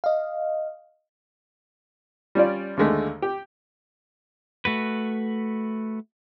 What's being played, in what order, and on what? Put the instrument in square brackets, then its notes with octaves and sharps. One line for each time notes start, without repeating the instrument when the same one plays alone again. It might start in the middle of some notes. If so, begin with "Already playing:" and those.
[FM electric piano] D#5 F5
[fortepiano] G3 C#4 F4 D5
D#2 D3 G#3 A3
G4
[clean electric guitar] A3 F#4 B4